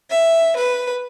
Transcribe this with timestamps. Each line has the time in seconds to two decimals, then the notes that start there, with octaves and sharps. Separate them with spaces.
0.10 E5
0.57 B4